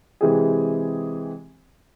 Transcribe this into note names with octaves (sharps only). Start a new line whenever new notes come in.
C3 E3 G#3 C4 G4 G#4